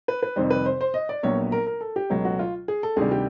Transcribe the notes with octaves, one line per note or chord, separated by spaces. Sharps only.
B4
B4
F2 C3 D#3 G3 C5
B4
C5
C5
D#5
D5
A#1 A#2 F#3 B3 C#5
A#4
A#4
A4
G4
C#2 B2 F#3 A3
F#4
F4
G#4
A4
D2 C3 D#3 G3 G#4
G4